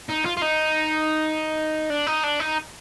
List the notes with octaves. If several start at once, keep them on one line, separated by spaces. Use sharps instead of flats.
D#4
F4
F4
D#4
D4
D#4
D4
D#4